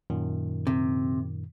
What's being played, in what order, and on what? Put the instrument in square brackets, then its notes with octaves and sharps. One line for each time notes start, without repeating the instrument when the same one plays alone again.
[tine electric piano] F#2 A#2 D#3
[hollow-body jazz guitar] C3